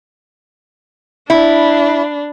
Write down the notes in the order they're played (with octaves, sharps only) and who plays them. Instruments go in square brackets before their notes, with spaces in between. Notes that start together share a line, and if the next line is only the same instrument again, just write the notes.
[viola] D4 [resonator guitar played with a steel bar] E4